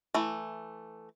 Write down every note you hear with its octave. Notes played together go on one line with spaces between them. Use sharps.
E3 A3